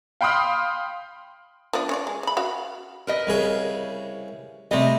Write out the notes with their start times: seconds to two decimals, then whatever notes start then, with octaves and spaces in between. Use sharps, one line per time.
0.21 F5 G5 B5 C6 D#6 F6
1.73 F3 B3 D4
1.89 C#4 C#5 D5
2.07 G#3
2.23 C#3 B5
2.37 F#4 F5
3.07 A#4 B4 D#5
3.27 C2 C#3 G#4
4.71 C3 G3 A3 D#5